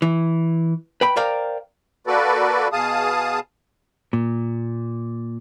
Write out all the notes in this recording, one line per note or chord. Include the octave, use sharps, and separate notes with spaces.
E3
B4 G5 B5
A#4 C5 D5 F5 G5 A#5
A#3 F#4 A4 B4 D5
B2 G#4 F5 A5 D#6
A#2